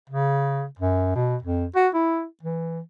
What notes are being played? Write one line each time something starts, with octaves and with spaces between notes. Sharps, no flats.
C#3
F#2
B2
F2
F#4
E4
E3